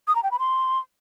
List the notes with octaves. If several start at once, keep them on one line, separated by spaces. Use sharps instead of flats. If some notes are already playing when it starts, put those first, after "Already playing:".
D#6
A#5
G5
B5
C6